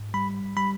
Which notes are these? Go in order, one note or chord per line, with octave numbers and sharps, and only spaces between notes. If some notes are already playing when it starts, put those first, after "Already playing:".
Already playing: G#2
G3 B5
G3 B5